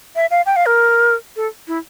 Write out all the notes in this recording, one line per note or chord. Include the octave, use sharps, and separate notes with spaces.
E5
F5
G5
F5
A#4
A4
E4